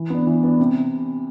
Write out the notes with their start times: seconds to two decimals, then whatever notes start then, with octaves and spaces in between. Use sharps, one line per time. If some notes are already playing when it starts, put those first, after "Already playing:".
Already playing: E3
0.10 B3 D4
0.27 E3
0.43 B3 D4
0.60 C3